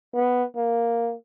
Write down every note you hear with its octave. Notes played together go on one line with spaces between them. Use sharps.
B3
A#3